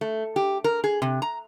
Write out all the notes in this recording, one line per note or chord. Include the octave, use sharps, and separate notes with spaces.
A3
G4
A#4
G#4
C3
A#5